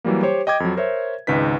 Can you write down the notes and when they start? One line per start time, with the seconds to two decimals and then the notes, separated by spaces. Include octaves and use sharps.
0.04 E3 F#3 G3 A#3
0.23 G4 C5 C#5
0.47 D#5 G5 D6 G#6
0.60 F2 F#3
0.77 A#4 C5 C#5 E5
1.27 G#1 C#2 D#4 B4 B6